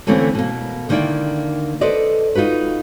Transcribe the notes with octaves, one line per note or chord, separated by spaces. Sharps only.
D3 E3 A3 A#3 C4 C#4
B2 A#3
D3 D#3 A#3 E4 D5 G5
A4 B4 C5 D5 D#5
D#4 F4 F#4 B4